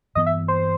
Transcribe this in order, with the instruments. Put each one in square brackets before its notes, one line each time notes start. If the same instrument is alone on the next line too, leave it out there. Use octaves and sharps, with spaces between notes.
[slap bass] G2 E3 B3 [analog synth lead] D#5
[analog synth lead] E5
C5